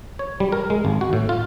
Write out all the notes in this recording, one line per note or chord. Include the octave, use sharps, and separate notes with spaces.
C#5
G3
A#4
G#3
G#1
F#4
A2
F4